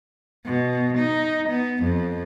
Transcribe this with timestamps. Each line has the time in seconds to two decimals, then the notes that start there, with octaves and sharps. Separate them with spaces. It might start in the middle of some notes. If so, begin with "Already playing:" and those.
0.46 B2
0.98 D#4
1.49 B3
1.83 F2